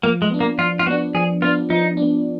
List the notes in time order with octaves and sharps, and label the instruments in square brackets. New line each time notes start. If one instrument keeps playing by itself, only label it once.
[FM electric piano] F3 [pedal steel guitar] A#3
[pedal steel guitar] G#3
[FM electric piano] B3 D4
[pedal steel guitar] A#3
[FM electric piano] F3 [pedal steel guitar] F4
[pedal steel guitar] F4
[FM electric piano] B3 D4 [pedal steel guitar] F#4
[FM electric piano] F3 [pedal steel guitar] G#4
[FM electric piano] B3 D4 [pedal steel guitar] F4
[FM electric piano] F3 [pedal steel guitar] D#4
[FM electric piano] B3 D4